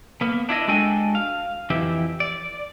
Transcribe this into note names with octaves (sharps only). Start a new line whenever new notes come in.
A#3 B3
D4 E4 F4 D#5
G#3 D4 F#4 A4 G5 G#5
F5
F2 E3 E4 G4
D5